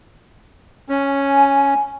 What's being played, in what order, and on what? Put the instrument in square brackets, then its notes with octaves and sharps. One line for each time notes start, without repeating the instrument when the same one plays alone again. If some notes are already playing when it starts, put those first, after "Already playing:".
[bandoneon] C#4 [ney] G#5